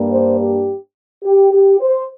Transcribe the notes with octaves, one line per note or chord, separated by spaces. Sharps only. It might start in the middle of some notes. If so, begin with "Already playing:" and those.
Already playing: G2 G3 A#3 D4
C5
G4
G4
G4
C5